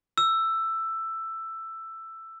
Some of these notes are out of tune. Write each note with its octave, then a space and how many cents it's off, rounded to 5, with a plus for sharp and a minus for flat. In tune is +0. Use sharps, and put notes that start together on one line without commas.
E6 +10